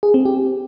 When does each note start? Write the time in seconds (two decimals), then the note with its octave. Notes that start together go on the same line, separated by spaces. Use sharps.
0.03 G#4
0.14 C4
0.25 G4